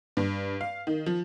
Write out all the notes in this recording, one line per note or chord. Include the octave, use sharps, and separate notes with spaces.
G2
F5
D#3
F3